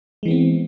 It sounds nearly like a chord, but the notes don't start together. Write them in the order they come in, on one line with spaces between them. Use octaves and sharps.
G#3 E3 B3 C4